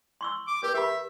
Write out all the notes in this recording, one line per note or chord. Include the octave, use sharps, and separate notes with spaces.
C6 C#6 E6
D6
G4 A#4 B4
G4 E5 B5